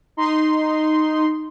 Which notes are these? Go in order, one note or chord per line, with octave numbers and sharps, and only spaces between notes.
D#4 C6